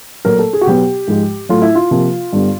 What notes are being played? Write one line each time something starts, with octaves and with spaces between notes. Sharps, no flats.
A#2 F#3 A3 A#4
A4
G#4
F#4
B2 F#3 B3 G4
G#2 F3 G#3
A2 F#3 A3 F4
E4
F4
C3 F3 A#3
G2 D3 G3 B3